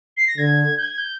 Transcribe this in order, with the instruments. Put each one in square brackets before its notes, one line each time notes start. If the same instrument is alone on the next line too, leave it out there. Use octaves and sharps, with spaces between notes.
[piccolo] C7
A#6
[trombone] D3 [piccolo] G#6
[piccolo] G6
G#6
G6